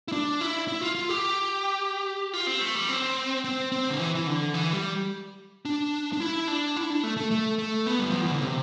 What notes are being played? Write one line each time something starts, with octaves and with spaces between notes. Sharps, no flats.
E4
D4
E4
E4
F4
F4
G4
F4
C4
A3
G3
C4
C4
C4
D3
E3
E3
D3
E3
G3
D4
D4
E4
D4
E4
D4
A3
A3
A3
A3
B3
G3
F3
E3
D3
C3